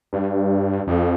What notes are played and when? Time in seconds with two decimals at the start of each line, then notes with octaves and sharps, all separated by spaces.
0.13 G2
0.87 F2